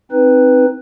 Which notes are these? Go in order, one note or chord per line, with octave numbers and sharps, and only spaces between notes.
C4 D#4 B4